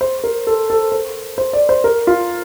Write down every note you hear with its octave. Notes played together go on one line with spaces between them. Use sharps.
C5
A#4
A4
A4
C5
C5
D5
C5
A#4
F4